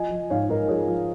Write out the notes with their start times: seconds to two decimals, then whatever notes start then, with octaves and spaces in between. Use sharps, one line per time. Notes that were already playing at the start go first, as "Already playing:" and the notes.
Already playing: F3 D#5 G#5
0.11 F3
0.30 G#2 C#5 F5
0.50 G#2 A#4 D#5
0.68 F3 G#4 C#5
0.87 F3